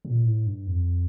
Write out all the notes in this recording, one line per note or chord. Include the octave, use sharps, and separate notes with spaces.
A#2
A2
G2
F2